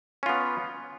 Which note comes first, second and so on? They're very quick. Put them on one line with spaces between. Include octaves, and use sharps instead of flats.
C#4 F4 B3